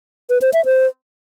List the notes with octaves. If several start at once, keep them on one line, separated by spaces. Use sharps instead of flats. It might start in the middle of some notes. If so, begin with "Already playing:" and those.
B4
C5
E5
C5